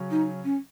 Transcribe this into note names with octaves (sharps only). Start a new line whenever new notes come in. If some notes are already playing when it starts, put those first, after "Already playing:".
Already playing: C#3 F#3 C#4
D#4
C#4